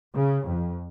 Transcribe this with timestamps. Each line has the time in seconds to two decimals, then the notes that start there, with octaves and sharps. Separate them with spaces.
0.14 C#3
0.47 F2